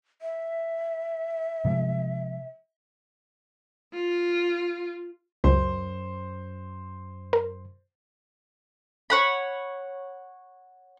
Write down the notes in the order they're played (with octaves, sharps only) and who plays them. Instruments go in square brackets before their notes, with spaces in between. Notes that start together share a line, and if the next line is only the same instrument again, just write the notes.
[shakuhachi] E5
[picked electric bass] C3 F3 G#3
[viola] F4
[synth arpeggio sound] C#2 [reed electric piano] F#2 [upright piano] C5
[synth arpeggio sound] A#4
[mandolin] C#5 F#5 B5